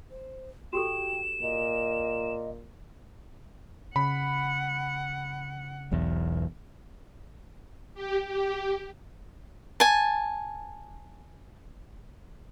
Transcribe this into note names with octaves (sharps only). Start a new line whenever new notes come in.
C5
F#4 G4 A4 G5 E7
A#2 D#5
C#3 F#5 B5
E1 B1 E2
G4
G4
G#5 A5